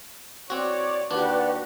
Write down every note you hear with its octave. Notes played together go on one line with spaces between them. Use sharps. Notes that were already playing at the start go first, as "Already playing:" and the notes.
C4 F#4 C#5 D5
D#2 D4 F#4 G4 B4 D5 F#5